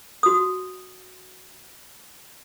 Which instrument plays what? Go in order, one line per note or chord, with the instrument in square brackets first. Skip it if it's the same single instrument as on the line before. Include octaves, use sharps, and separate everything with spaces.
[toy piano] F#4 D#6